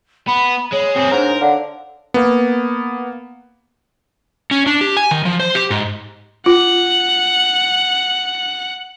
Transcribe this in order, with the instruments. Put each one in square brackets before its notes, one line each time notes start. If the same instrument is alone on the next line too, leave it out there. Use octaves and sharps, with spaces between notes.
[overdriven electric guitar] B3 [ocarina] B5
[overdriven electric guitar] G#3 [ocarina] C#5
[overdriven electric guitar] C4 G#4
[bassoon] G#2 [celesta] D4 D#4 C5 [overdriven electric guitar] A#4
[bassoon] D3 [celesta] C#5 F5 F#5
[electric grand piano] A#3 B3
[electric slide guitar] C#4
D4
G4
G#5
D#3
F3
C5
G4
G#2
[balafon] F4 [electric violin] F#5